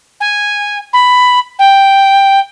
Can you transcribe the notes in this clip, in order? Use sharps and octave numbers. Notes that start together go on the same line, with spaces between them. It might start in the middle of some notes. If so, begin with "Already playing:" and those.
G#5
B5
G5